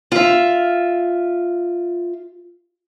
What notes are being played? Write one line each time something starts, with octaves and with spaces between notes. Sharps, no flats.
F4 E5